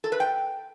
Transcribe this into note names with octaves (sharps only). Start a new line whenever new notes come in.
A4
B4
G5